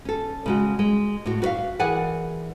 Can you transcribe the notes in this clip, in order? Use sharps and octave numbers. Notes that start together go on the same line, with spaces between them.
C#4 A4
C#3 G#3 F#4
G#3
A2 F#4
F#4 A#4 D5 E5 F5
E3 G#4 A#4 D5 F#5 G#5